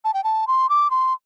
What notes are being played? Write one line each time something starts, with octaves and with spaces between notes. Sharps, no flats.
A5
G5
A5
C6
D6
C6